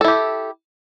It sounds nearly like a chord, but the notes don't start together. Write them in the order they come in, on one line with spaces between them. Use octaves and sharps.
A4 E4 G4